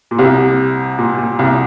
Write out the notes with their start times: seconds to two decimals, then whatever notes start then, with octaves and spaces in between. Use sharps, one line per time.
0.11 A#2
0.18 C2 C3
0.99 A#2
1.19 A#2
1.39 C2 C3